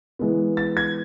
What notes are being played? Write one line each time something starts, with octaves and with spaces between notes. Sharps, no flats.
E3 G#3 B3
A6
G#6